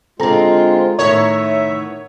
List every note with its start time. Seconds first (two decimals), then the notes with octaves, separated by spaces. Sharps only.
0.20 D3 G#3 C4 F4 A4 A#5
0.99 A2 D#3 B3 C#5 E5